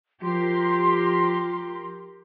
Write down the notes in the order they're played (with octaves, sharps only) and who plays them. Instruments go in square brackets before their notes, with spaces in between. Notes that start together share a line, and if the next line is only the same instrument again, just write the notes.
[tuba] F3 [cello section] G4 A#4 [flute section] C6